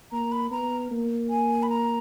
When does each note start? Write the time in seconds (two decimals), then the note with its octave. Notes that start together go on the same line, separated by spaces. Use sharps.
0.12 A#3 A#5
0.32 B5
0.51 B3 A#5
0.91 A#3
1.30 G#5
1.63 B5
1.69 A#5